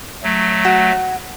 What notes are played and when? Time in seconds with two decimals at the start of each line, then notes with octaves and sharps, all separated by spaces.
0.23 F#3 A3
0.65 F#4